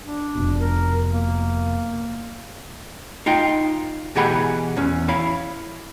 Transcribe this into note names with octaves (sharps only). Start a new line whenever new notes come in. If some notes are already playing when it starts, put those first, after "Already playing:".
D4
F1 F2 B2
A#4
A#3
D#4 F4 G5
B2 E3 G4 G#4 F#5 B5
E2 C#4
E4 C#5 F5 B5